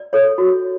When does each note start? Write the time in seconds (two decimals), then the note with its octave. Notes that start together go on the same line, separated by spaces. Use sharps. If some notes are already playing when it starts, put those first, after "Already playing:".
Already playing: D5
0.13 A4 C#5
0.38 F#4